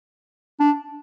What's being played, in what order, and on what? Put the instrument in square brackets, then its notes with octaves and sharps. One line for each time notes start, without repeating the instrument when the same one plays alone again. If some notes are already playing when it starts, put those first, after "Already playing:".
[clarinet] D4